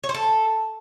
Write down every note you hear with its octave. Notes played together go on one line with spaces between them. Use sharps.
C#5
C5
A4